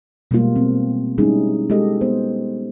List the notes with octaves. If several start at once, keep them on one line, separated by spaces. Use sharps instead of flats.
B2 G3 G#3 A#3 F4
B3 C4
G3 G#3 C#4 D#4 E4 G#4
G#3 F4 G4 A4 D#5
B3 C5